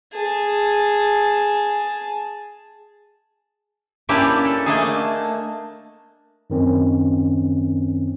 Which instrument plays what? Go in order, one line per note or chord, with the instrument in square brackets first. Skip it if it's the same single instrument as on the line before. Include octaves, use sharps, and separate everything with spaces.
[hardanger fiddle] G#4 A5
[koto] A#3 C#4 D4 E4 G4 B4
A4
A3 A#3 D4 D#4 G#4
[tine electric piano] F#2 D#3 C4 C#4